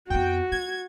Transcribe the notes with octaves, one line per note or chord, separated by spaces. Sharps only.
F2 B3 F#4 G5
A3 G#6